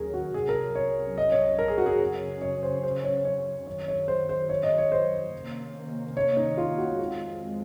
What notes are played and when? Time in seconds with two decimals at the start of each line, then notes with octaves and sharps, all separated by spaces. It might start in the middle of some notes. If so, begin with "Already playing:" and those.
Already playing: D#2 D#3 F#3 C#4 G#4 A#4
0.14 F#4
0.34 C2 C3 F#3 C#4 G#4
0.49 A#4
0.75 C#5
1.18 D#5
1.32 C#5
1.59 A#4
1.68 G#4
1.78 F#4
1.86 G#4
2.01 F#2 C#3 F#3 C#4
2.42 C#5
2.63 C5
2.83 C5
3.04 C#5
3.25 C#5
3.67 F#2 D#3 F#3 C#5
3.88 C#5
4.08 C5
4.29 C5
4.49 C#5
4.63 D#5
4.78 C#5
4.92 C5
5.33 C3 D#3 A#3 C#4
6.17 C#5
6.37 D#4
6.57 F4
6.78 F#4
6.99 F2 D#3 G#3 C4 F4